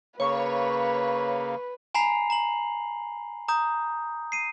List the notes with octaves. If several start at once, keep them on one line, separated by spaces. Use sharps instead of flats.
C#3 A#3 B4 C#5 C#6
G#5 A#5 B5 C7 F7
A#5 F#7
A#5 D#6 G6
C7 D#7